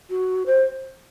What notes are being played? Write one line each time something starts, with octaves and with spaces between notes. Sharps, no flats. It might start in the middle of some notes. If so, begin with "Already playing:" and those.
F#4
C5